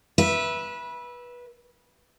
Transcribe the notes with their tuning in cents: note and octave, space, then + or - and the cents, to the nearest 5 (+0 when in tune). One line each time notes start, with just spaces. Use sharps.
B4 -20 E5 +0